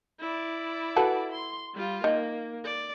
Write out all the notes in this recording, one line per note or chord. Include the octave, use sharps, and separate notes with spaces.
E4 D5
F#4 A4 B4
C6
G3 F4
D#3 A#3
D5